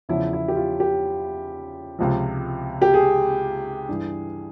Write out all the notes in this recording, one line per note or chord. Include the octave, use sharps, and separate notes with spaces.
E2 C#3 F3 E4
E4
G4
F4
G4
C#2 C3 F3
G4
G#4
G2 E3